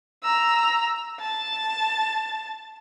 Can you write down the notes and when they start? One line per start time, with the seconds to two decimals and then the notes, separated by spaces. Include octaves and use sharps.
0.23 A#5 E6
1.21 A5